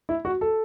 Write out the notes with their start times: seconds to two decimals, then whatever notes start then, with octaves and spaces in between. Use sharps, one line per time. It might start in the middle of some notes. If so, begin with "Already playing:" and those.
0.09 E4
0.25 F#4
0.41 A4